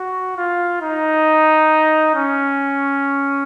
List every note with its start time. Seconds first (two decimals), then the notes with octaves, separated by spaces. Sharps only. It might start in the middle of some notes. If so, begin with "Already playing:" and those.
Already playing: F#4
0.37 F4
0.82 D#4
2.15 C#4